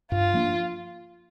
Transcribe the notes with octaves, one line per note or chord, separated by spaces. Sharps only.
G2 F4
F3 A#3 D4